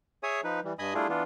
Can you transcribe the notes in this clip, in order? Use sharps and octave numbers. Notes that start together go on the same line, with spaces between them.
G#4 C#5 E5 G#5 D#6
F3 D#4 B4
E3 G3
G2 D#5 G#5 B5 D#6
G3 A3 D4 E4 F4 G#4
E3 B3 D4 F4